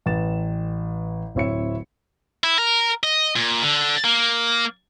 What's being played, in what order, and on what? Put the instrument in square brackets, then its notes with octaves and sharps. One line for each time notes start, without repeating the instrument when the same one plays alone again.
[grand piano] A1 B4 A6 E7
D1 C4 E4 C#5 E5 C#7
[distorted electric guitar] E4
A#4
D#5
A#2
D3
A#3